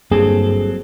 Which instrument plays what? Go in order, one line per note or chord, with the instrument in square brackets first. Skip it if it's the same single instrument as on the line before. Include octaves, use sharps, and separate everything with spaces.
[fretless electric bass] G1 A#3 [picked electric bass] G2 [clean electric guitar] F#3 C4 A4 [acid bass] G#4